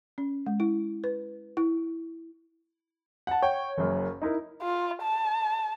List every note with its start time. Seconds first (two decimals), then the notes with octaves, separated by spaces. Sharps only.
0.18 C#4
0.46 G#3
0.60 E4
1.04 B4
1.57 E4
3.27 F#5 A5
3.43 C#5 G5
3.77 F#1 F#2
4.22 D#4 E4 A#4
4.62 F4
5.02 A5